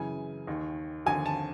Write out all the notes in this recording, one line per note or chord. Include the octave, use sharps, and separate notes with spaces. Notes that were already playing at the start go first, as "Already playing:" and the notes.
Already playing: F#2 C#3 E3 G#5
D#2 D#3
D#2 D3 F3 G#5
A5